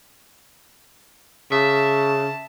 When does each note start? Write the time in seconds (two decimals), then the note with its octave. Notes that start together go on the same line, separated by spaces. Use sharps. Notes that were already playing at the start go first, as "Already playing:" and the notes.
1.52 C#3 E5 A5